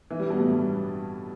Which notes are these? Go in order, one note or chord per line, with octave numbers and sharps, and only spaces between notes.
E3
G3
B2
A2
G2